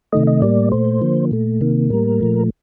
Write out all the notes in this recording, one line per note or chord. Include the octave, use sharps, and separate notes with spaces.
C3 D#3 A3 D#5
D#5
A2 G3 A#3 D5
A#2 A3 C5
D3 F3 A#3
A#2 A3
C3 D#3 A#3
A2 G3 A#3 A#4
A#2 F3 A3